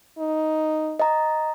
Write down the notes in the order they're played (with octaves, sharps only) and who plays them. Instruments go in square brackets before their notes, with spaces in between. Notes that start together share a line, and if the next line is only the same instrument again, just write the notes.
[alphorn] D#4
[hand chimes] D#5 A#5